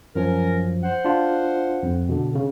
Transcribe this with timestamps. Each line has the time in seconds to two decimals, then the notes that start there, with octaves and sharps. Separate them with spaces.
0.16 F#2 F3 C#4 A#4
0.83 C5 F#5
1.05 D4 F4
1.83 F2
2.09 B2 D3
2.35 C#3